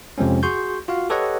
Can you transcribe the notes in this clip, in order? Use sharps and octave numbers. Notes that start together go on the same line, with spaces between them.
F2 C3 F3 G#3 C4 C#4
F#4 G#4 C6 C#6 G6
F4 F#4 F5
G4 A4 B4 C#5 D#5 F#5